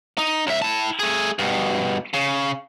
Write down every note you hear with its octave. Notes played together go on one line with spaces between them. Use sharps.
D#4
C#2 E5
E4 A5
A3 G#4
G2 B2
C#3